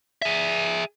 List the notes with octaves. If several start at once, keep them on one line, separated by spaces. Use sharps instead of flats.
G#4 E5